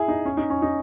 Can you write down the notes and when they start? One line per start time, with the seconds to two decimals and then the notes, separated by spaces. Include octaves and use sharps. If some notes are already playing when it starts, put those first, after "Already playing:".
Already playing: E4 G#4
0.08 D#4
0.25 C#4
0.37 D#4
0.50 C#4
0.62 D#4